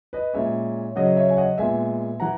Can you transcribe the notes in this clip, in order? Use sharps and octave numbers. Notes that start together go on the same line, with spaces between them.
B4 D#5
A#2 G#3 C#4 C#5 E5
C#3 F#3 C#4 D#5 F#5
C#5 E5
G#5
D#5 F#5
A#2 G#3 B3 E5 G#5
E3 F#5 A#5